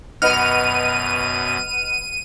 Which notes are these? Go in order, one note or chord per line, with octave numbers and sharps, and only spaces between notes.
F#2 B2 B4 D#5 F#5 F6 D#7